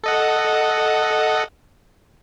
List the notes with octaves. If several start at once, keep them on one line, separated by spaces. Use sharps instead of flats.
A4 D#5 F#5